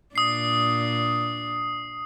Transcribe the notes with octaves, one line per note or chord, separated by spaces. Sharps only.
A#2 D4 D#6 C7